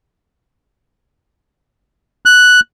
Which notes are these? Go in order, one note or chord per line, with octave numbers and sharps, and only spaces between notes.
F#6